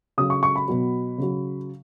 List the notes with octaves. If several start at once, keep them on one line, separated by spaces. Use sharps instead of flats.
C#3 F#3 D#6
C#6
C#6
B5
B2 F#3
C#3 F#3